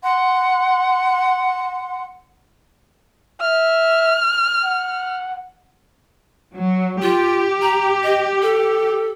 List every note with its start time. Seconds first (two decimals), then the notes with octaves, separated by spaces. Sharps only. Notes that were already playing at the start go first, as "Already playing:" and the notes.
0.02 F#5 C6
3.41 E5 F6
4.64 F#5
6.55 F#3
7.02 F4 G4
7.62 A#5
8.04 D#5
8.42 A4